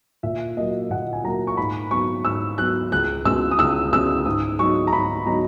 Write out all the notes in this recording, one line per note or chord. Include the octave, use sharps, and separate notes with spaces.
A#2 E5
F#3 A#3 D#5
A#2 F#5
G#5
F#3 A#3 A#5
C#6
G#2 B5
F#3 B3 C#6
G#2 E6
F#3 B3 F#6
C#2 F#6
B2 G#3 C#4 E6
D#6
C#2 E6
B2 G#3 C#4 E6
G#2 D#6
F#3 B3 D#4 C#6
A#5
G#2 B5
F#3 B3 D#4 A#5